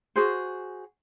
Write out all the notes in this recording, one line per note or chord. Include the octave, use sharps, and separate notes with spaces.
F#4 G#4 C5